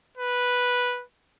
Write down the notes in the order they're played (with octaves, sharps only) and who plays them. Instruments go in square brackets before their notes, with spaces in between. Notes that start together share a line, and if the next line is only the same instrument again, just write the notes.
[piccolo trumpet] B4